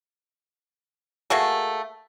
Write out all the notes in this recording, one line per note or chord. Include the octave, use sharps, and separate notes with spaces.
A3 A#3 F#4 G#4